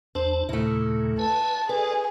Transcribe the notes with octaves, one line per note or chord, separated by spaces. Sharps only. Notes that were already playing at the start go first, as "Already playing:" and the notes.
E2 D4 C5 A5
D#2 A#2 C#3 A3 E4
B4 G#5 A5
G#4 A4 B4 D5